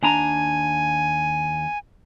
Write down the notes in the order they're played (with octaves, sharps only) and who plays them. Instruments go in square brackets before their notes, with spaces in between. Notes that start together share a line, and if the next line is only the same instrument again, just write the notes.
[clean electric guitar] D#2 D4 A#5 [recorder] G#5